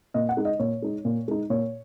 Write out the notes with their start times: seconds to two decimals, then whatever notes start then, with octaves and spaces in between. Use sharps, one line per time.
0.14 A#2 D#5
0.29 F#5
0.37 G#3 D#4
0.45 D#5
0.60 A#2 C#5
0.82 G#3 D#4
1.05 A#2
1.28 G#3 D#4
1.50 A#2 C#5